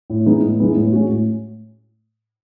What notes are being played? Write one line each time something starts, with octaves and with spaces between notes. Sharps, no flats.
A2
E3 G#3 B3 D#4
A2
E3 G#3 B3 D#4
A2
G#3 C#4 F#4
A2